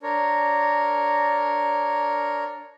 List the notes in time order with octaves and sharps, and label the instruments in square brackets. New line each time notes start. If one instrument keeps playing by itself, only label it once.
[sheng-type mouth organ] D4 A#4 C#5